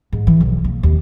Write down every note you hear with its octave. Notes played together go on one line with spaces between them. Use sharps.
G#2
E3
B1
A#3
D#2